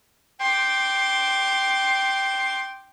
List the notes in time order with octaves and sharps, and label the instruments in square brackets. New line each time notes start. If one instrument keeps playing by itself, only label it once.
[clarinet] G5 [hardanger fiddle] C6 D6